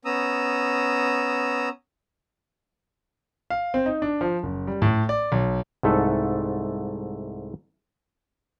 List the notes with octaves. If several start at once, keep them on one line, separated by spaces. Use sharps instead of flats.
B3 C#4 A#5 D#6 E6
F5
C4
D#4
D4
F3
F#1
G3
A2
D5
B1
C2 G#2 A3 A4 F#5